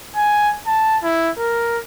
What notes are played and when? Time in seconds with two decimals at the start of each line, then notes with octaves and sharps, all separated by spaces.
0.16 G#5
0.67 A5
1.03 E4
1.39 A#4